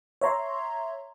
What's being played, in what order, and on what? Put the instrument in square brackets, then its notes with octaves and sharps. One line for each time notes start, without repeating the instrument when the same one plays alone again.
[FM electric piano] C#5 E5 A#5 C6